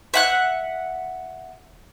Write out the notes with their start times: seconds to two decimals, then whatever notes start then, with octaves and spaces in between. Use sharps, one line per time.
0.14 E5 F#5 F#6